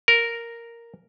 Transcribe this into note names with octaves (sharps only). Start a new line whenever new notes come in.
A#4